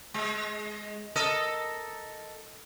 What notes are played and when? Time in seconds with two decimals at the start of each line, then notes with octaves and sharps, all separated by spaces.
0.14 G#3
1.16 A4 A#4 D#5